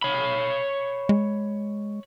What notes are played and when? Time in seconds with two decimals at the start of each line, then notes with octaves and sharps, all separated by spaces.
0.03 C#5 B5
1.09 G#3